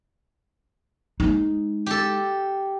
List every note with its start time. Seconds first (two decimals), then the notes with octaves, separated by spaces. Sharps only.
1.20 G#3 D#4
1.86 G4 A4